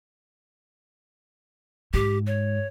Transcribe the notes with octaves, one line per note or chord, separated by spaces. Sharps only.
G#2 G4
C#5